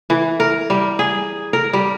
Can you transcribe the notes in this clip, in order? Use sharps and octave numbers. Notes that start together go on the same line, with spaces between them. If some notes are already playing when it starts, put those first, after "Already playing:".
E3
A#4
G3
G#4
A#4
G3